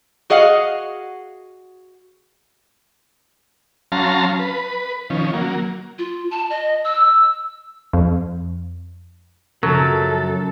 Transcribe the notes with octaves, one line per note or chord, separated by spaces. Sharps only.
F#4 G#4 D#5 F5 F#5
F#3 C#4 F5 A5 A#5 C6
B4
D#3 F3 C#4
F#3 A#3
F4
A5
D#5
E6
F2
F#2 C#3 F3 F#3 A4 A#4